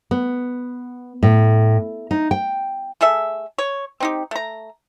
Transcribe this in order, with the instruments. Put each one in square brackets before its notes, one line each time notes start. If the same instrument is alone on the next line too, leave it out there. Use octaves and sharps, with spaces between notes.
[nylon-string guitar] B3
A2
D#4
G5
[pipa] A3 G#4 A4 E5
C#5
C4 D#4 G4
A3 A#5